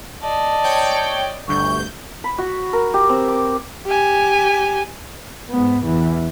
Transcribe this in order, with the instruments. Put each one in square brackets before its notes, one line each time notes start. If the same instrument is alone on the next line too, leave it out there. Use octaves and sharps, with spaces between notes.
[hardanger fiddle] D5 D#5 [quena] A5
[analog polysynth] C#5 G5
[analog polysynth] G1 D2 G6 [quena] C#6
[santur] B5
F#4
A#4
G4
C4
D6
[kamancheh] G4 G#5
[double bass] G#2 B3
E2 E3